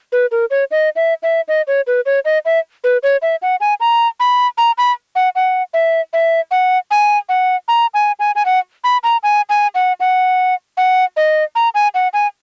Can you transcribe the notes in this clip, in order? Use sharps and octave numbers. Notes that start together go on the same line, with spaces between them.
B4
A#4
C#5
D#5
E5
E5
D#5
C#5
B4
C#5
D#5
E5
B4
C#5
E5
F#5
G#5
A#5
B5
A#5
B5
F#5
F#5
E5
E5
F#5
G#5
F#5
A#5
G#5
G#5
G#5
F#5
B5
A#5
G#5
G#5
F#5
F#5
F#5
D#5
A#5
G#5
F#5
G#5